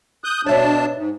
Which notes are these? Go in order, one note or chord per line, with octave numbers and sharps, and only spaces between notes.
D#6 F#6 G6
B2 D4 C#5 E5 A5
G#2